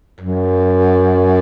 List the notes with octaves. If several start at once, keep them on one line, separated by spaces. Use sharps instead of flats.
F#2